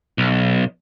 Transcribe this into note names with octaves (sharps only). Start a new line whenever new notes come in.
B1